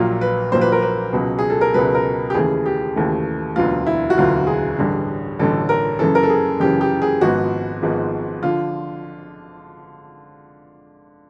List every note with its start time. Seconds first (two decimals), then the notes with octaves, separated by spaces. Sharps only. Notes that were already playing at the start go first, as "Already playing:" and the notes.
Already playing: A#1 A#2 F#3 A#3 F4
0.21 B4
0.52 A#1 A#2 F#3 A#3 C5
0.61 B4
0.72 A#4
0.82 B4
1.13 C#2 B2 F#3
1.39 G#4
1.50 A4
1.61 A#4
1.74 C#2 B2 F#3 B4
1.95 A#4
2.30 G4
2.34 D#2 C#3 E3 A3 G#4
2.66 G4
2.96 D#2 C#3 E3 A3
3.56 E1 D2 D3 F#3 B3 F4
3.87 E4
4.10 F#4
4.17 E1 D2 D3 F#3 B3 F4
4.47 G#4
4.79 A1 G2 D3
5.39 A1 G2 D3 A4
5.69 A#4
5.99 F#2 C#3 E3 A4
6.15 A#4
6.23 A4
6.30 G#4
6.60 F#2 C#3 E3 G4
6.81 G4
7.02 G#4
7.21 G#1 G#2 F3 G#3 B3 F#4
7.82 G#1 G#2 F3 G#3 B3
8.43 D3 F3 F4